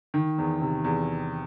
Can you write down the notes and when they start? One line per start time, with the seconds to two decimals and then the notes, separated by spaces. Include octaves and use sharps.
0.14 D#3
0.38 E2
0.61 C3
0.84 E2